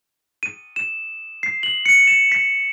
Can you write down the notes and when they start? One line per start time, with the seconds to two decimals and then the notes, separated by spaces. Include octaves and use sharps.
0.43 D#7
0.76 E7
1.43 C7
1.63 F#7
1.86 C#7
2.07 E7
2.32 B6